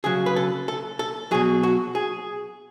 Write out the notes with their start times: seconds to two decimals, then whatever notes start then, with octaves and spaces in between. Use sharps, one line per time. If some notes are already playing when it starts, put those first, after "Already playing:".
0.04 C#3 F#3 G#4
0.26 B4
0.36 A4
0.68 A4
0.99 A4
1.31 B2 F#3 G#4
1.63 F#4
1.95 G#4